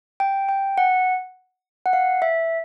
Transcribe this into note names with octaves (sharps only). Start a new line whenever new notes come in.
G5
G5
F#5
F#5
F5
E5